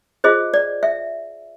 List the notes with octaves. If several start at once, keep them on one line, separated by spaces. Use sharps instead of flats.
F4 G#4 C5 D#5
D5
E5